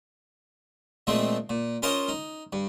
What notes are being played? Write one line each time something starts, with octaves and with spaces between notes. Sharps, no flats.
A#2 F3 G#3 A3 C4
A#2
C#4 F4 A#4 C5 D#5
D#4
G2